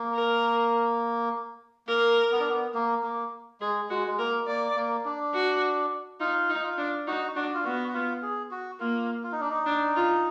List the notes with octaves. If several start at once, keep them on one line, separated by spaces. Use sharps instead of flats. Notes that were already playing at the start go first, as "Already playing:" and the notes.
Already playing: A#3
A#4
A#3 A#4
B3
D4
B3
A#3
A#3
G#3 G#4
G#3 F#4
G#3
A#3 A#4
A#3 D5
A#3
D4
F#4
D#4 F4
D#4
F4
D4
D#4 F#4
D4 F#4
F4
B3 F#4
F#4
F4
G#4
F#4
A#3 F4
F4
D#4
D4
D#4
D4
F4